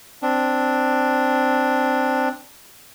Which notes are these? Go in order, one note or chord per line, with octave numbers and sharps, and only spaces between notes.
C4 D4